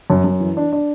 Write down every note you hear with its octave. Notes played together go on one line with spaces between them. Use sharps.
F#2
F#2
E3
D4
D4